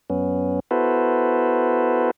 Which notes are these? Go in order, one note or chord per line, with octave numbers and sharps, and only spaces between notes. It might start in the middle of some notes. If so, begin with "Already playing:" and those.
F#2 B3 C#4
B3 E4 F#4 A4 B4 C5